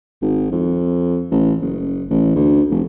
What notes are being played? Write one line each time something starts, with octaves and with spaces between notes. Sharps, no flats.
G#1
F2
A1
F#1
A1
D2
F1